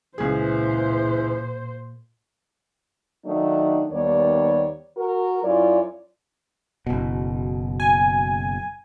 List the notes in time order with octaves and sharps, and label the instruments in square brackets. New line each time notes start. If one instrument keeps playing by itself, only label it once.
[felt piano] C#2 G#4 [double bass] A#2 [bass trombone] E3 [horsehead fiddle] C5
[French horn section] D#3 F#3 A3 D4 D#4
D#2 D#3 G3 B3 C#5 D5
F#4 A#4
F#2 F#3 E4 F4 C#5 D5
[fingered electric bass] F#1 B2
[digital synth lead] G#5